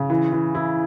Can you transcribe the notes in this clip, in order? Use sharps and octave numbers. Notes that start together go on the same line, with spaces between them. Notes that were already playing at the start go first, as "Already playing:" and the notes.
Already playing: C#3
E3
E3
E4